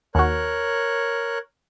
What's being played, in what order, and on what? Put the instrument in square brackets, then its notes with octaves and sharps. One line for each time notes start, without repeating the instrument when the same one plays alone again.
[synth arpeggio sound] D#2 F#4 [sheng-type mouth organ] A#4 C#5 F#6